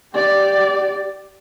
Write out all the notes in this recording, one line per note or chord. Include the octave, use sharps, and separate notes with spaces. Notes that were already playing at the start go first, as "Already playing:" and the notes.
G4 D5